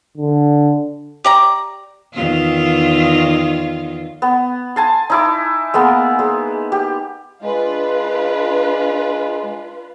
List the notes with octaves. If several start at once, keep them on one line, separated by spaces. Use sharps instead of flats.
D3
G4 D5 A#5
E2 D#3 F4
B3
G#5 A5 C6
D#4 E4 D6
G#3 A#3 B3
G#3
G4
G#3 D4 F4 B4